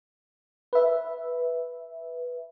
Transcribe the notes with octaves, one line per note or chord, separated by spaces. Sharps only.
B4 E5